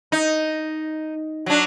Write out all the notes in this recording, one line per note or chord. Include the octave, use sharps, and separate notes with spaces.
D#4
F#3 D4